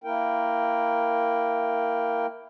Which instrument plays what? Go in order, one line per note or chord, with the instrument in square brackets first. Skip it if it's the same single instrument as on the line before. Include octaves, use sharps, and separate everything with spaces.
[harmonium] A#3 E4 A#4 G5